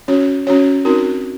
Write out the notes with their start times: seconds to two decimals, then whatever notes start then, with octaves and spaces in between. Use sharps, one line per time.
0.08 C#4 F#4 C#5
0.47 C#4 F#4 C#5
0.85 C4 D#4 F#4 A#4